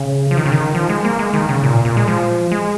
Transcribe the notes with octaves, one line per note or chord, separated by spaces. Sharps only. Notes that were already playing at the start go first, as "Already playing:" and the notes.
Already playing: C#3
F3
D#3
C#3
D#3
F3
G#3
A#3
G#3
D#3
C#3
A#2
A#2
G#3
F3
G#3